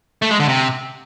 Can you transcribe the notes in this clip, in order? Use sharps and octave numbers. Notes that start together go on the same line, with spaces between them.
A3
G#3
D3
C3